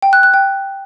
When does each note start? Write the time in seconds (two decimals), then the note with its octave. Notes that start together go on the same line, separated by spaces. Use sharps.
0.02 G5
0.13 F#6
0.23 F#6
0.34 G5